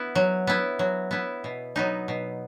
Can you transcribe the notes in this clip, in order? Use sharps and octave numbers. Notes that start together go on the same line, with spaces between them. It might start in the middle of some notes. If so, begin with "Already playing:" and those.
Already playing: B3 E4
F#3
B3 E4
F#3
B3 E4
B2
F#3 B3 D#4
B2